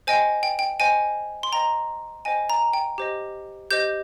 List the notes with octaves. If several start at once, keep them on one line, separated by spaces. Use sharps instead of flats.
C5 D#5 G5 G#5
G5
G5
C5 D#5 G5 G#5
C6
C5 D#5 G5 A#5
C5 D#5 G5 G#5
A#5
G5
G4 C5 D#5
G4 C5 D#5 G6